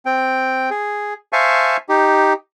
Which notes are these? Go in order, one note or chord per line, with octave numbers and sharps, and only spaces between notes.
C4 G5
G#4
C5 E5 F5 G#5 A5 C#6
D#4 G4